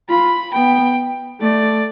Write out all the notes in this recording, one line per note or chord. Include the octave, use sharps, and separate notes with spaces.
F4 B5
B3 G5
A3 D5